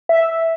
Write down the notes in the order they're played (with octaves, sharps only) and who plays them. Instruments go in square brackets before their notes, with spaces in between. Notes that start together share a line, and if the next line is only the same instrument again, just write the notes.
[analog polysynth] E5